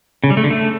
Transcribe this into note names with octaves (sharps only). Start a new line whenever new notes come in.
C#3
G3
A3
D3
A3